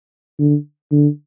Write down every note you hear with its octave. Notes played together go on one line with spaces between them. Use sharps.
D3
D3